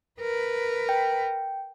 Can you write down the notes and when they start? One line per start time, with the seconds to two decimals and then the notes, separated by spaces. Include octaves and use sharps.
0.21 A#4 B4
0.89 G5